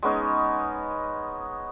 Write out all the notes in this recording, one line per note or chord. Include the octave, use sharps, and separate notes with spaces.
G#3 B3 C#4 D#4